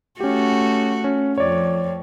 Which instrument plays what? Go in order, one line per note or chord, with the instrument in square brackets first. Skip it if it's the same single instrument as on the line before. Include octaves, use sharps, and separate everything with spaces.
[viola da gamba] A3 F#4 [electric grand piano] C#4 G4
[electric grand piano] C#4
[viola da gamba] F2 [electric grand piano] C#5 D5